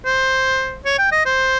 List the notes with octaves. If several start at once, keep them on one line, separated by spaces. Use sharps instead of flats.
C5
C#5
G5
D#5
C5